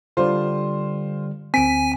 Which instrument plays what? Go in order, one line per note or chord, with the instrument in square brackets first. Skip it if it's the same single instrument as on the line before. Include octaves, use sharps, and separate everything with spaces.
[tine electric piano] D3 G3 [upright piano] F4 C5
[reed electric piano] D2 C4 [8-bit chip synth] G#5 [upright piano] B6 D7